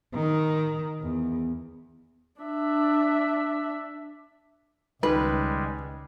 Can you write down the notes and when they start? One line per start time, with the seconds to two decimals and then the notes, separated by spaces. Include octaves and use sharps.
0.14 D#3
1.01 E2
2.41 D4 E5
5.03 C#2 D#3 G3 G#3 B4